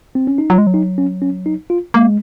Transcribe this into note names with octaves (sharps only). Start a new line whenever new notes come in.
C4
C#4
D#4
F#3 F4
G#3
F#3
D#4
C#4
C#4
D#4
F4
G#3 A#3